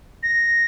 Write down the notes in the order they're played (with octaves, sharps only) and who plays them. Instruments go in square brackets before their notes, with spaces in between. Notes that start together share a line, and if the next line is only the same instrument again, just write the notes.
[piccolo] A#6